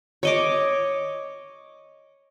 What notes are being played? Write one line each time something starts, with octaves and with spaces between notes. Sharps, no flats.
C#5 D#5 D6